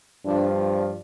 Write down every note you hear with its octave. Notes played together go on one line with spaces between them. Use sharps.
G2 F3 D4